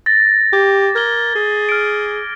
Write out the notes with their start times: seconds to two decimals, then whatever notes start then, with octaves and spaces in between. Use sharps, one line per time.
0.06 A6 A#6
0.53 G4 D6
0.96 A#4 G#6 G7
1.36 G#4
1.69 F6 D7